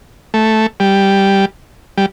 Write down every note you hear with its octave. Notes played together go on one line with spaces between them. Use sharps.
A3
G3
G3